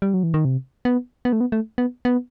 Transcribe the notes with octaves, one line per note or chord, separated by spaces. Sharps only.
G3
F#3
E3
D#3
C3
B3
B3
A3
B3
A3
B3
B3